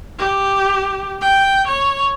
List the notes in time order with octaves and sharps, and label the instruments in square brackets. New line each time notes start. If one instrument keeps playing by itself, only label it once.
[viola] G4
G5
C#5